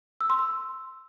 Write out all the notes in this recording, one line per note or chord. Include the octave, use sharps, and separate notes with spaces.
E6
C6
E6